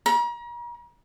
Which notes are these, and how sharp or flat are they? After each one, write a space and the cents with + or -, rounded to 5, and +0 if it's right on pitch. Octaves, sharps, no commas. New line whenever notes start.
A#5 +40